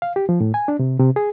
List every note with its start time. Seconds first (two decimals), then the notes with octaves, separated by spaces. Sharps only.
0.02 F5
0.16 G4
0.29 F3
0.41 A2
0.54 G#5
0.68 D4
0.79 C3
0.99 C3
1.16 G#4